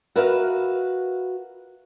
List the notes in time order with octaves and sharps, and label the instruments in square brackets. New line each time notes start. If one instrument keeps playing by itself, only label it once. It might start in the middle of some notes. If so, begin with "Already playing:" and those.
[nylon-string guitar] F#4 A#4 B4 E5 F5